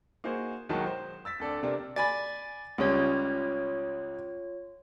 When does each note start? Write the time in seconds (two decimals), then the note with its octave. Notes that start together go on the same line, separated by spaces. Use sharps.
0.24 A#3 D#4 F#4 G#4 C5
0.69 B1 D#3 F#3 G#3 F#4 A5
0.86 C5
1.25 E6 A6 B6
1.40 D2 C4 A4 D5
1.63 C3 C4 D4 A#4
1.96 D5 G#5 B5 A6
2.78 C#2 C#3 G3 F4 C#5